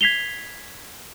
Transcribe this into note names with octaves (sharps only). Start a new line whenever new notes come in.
G#6 B6 C7 F7 G7